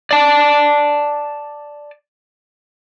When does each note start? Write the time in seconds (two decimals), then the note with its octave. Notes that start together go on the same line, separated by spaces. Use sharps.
0.11 D5 A5